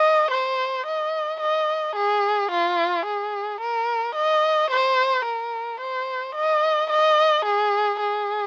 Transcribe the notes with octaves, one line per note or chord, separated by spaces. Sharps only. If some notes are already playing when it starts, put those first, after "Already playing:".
Already playing: D#5
C5
D#5
D#5
G#4
F4
G#4
A#4
D#5
C5
A#4
C5
D#5
D#5
G#4
G#4